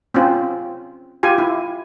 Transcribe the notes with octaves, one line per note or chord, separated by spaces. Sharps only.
C4 C#4 F4
F4 G4 G#5
E4